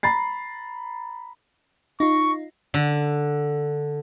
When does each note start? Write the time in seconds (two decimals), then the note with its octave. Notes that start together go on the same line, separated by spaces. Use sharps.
0.03 A#5 B5 A6 C7
2.00 D#4 F4 C#6
2.74 D3